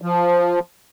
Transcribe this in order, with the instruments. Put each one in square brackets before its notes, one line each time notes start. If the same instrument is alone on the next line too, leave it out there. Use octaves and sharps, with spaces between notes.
[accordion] F3